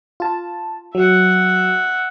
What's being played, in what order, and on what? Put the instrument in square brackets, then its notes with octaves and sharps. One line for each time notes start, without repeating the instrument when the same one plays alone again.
[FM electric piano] F4 A5
[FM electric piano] F#3 [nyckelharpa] E5 F#5